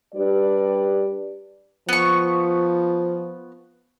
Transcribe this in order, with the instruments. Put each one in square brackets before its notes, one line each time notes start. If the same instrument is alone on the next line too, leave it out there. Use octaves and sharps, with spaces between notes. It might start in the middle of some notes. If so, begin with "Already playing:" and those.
[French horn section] G3 D4 G4 B4 D5
[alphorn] F3 [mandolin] B3 C#6